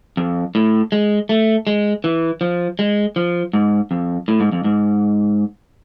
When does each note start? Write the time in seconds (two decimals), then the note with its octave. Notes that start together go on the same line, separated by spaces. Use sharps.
0.17 F2
0.55 A2
0.92 G#3
1.29 A3
1.67 G#3
2.04 E3
2.41 F3
2.79 G#3
3.16 F3
3.53 G#2
3.91 F2
4.28 A2
4.40 G#2
4.52 F2
4.64 G#2